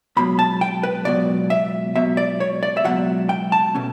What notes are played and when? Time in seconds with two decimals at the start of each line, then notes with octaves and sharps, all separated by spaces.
0.17 C#2 B2 F#3 B5
0.39 A5
0.61 G5
0.83 B4
1.05 C#2 B2 F#3 D5
1.50 E5
1.95 C#2 B2 F#3 E5
2.17 D5
2.40 C#5
2.63 D5
2.77 E5
2.84 C#2 B2 F#3 F#5
3.29 G5
3.52 A5
3.75 B2 A3 C#4